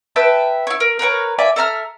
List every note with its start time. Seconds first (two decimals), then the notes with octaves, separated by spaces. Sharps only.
0.16 B4 E5 G5 A5
0.67 E4 C#5
0.80 A#4
0.99 A#4 B4 C#5 A#5
1.39 F4 D5 E5 G#5
1.56 A4 E5 A#5 F6